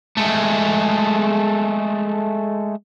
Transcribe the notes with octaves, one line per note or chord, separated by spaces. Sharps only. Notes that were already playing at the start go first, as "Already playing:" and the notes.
G#3 A3